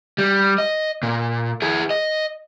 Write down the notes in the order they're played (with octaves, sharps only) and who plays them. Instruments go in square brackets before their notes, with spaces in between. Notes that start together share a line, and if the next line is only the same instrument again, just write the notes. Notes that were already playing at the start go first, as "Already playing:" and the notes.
[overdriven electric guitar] G3
D#5
A#2
E4 G#4
D#5